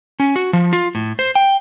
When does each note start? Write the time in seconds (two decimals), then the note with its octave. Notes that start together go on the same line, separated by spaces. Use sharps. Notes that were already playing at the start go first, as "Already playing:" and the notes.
0.20 C#4
0.36 F#4
0.53 F3
0.73 F4
0.95 A2
1.19 C5
1.35 G5